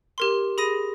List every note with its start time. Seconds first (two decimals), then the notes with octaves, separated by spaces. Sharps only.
0.18 G4 A#4 C6
0.58 G#4 B5 D#6 A#6 D#7